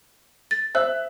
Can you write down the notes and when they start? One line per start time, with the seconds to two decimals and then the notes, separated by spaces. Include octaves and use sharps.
0.51 A6
0.75 C5 E5 E6 F#6